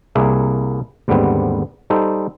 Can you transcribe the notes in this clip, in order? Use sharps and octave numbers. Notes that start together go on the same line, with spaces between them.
C2 A#3 G#4 D5 E5
D#2 G#2 D3 G3 B3 C4
G3 D#4 A4 C5